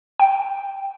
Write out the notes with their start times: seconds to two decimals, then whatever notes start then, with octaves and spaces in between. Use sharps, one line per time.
0.20 G5